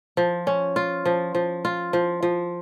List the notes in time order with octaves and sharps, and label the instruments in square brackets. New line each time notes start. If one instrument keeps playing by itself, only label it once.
[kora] F3
C#4
F4
F3
F3
F4
F3
F3